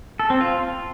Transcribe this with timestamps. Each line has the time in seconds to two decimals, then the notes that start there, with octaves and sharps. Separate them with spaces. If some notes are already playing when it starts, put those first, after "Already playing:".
0.19 A4
0.30 C4
0.41 F4